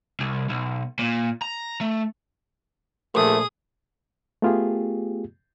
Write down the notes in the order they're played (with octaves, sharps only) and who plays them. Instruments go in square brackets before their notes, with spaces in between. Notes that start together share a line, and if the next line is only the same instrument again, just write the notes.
[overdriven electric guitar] C2
B1
A#2
A#5
A3
[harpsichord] A#1 [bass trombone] A3 [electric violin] G#4 D#6
[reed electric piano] A3 B3 F4 G4 G#4